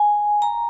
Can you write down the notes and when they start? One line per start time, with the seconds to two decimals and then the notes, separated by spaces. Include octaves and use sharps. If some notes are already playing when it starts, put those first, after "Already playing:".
Already playing: G#5
0.42 A#5